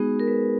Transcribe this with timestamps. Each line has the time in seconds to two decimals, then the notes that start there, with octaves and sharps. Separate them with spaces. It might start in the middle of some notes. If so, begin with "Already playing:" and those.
Already playing: G#3 B3 D#4 F#4 G#4
0.19 A#4
0.27 B4